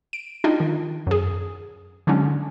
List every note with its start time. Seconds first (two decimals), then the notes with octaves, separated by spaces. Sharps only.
0.13 D7
0.44 D4 D#4 F4 D#5 G5
0.60 D#3
1.07 F#2 G#4
2.07 D3 F#3 G#3 C#4 D4